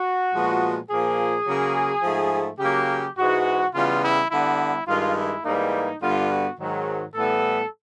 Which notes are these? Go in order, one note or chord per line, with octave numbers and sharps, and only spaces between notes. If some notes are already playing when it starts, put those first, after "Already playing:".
Already playing: F#4
A#2 F3 G#3 B3
A#2 F3 A#3 G#4
C#3 F#3 A#3
G#2 F3 A3
C#3 F#3 A#3 G4
G#2 E3 G#3 F#4
C#3 E3 G3 B3 F4
E4
D3 G3 B3 E4
G2 D#3 G#3 F4
E4
G#2 E3 G3 A#3 D#4
G2 D3 G3 B3 F4
F#4
G#2 D#3 F#3
A2 E3 G3 B3 A4